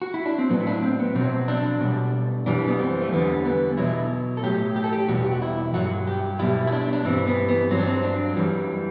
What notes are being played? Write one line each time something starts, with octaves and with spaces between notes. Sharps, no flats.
F#4
E4
D4
C4
A2 F#3 B3
E4
D4
C4
B3
B2 F#3 C4
D4
B2 G3
F#2 E3 G3 D4
B3
C4
A3
E2 D3 G3 B3
B3
B2 F#3 E4
A4
A2 F#3 G4
G4
A4
G4
E2 B2 G3 F#4
G4
F#4
E4
G2 F#3 F#4
G4
B2 G3 E4
E4
D4
D4
G2 E3 G3 C4
B3
B3
G2 F#3 C4
D4
C4
D4
F#2 E3 G3